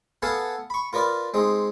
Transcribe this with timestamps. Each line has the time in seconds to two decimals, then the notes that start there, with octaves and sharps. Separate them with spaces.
0.22 B3 A4 F5 F#5 G#5 A5
0.70 B5 C#6
0.93 F4 A#4 B4 D5
1.34 G#3 C4 D#4